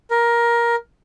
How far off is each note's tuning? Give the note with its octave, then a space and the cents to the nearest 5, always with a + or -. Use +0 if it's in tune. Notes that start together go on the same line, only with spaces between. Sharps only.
A#4 +15